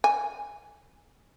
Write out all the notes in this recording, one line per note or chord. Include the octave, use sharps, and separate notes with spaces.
G#5